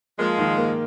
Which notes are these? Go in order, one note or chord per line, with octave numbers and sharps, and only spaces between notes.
F3 G#3 A#3
D#3
A#3